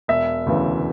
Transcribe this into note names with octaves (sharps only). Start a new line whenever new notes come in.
E1 E5
D2 C#3 E3